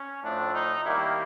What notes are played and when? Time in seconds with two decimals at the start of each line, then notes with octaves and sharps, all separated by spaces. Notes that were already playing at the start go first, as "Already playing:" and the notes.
Already playing: C#4
0.22 A2 F3 A3 D4
0.53 D#4
0.83 D#3 G3 A#3 E4